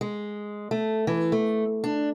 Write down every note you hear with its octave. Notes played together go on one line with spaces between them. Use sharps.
G#3
A3
E3
A3
D4